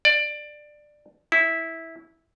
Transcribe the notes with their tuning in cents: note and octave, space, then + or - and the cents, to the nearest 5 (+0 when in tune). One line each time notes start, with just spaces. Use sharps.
D5 +15
E4 -10